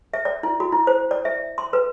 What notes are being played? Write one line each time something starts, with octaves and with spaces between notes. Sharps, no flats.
E5
D5
E4
F#4
E4
C5
D5
E5
C6
B4